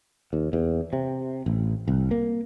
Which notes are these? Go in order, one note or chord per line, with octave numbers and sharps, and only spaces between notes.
D#2
E2
C3
A1
C2
A#3